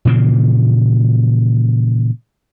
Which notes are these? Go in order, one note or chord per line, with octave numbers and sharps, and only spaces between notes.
A#2 C#3 E3 F3